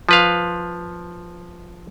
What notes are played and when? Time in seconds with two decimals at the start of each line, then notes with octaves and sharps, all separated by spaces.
0.09 F3 B4 F5